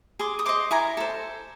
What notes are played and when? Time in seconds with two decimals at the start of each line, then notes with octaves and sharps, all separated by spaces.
0.19 G#4 C6 D6
0.39 D#6
0.46 C5 D#5 C6 D6
0.71 E4 G#5 A#5
0.97 A4 C5